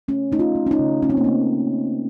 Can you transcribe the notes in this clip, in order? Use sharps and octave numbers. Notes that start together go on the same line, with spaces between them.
A3 C#4
A3 D#4
F4
A3
C#4
D#4
C#3
A3 C#4
C4
A#3
A3 C4